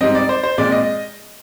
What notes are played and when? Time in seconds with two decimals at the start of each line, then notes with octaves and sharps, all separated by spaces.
0.01 G#2 G3 C4 D#5
0.15 D5
0.29 C5
0.44 C5
0.58 A#2 G#3 C4 D5
0.72 D#5